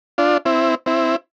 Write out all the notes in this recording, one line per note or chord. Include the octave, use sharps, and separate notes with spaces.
D4 F4
C4 E4
C4 E4